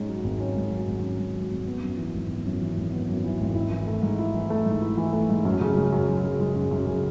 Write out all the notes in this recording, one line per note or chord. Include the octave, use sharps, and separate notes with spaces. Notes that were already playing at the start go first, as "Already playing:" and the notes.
Already playing: G#2 C#4
F#3
G#1
C#4
G#2
F#3
G#1
C#4
G#2
F#3
G#1
B3
F#2
E3
G#1
B3
F#2
E3
G#1
B3
F#2
E3
G#1
E4
E3
A3
G#2
E4
E3
A3
G#2
E4
E3
A3
G#2
F#2
C#3
G#3
F#2
F#2
C#3
G#3
F#2
F#2
C#3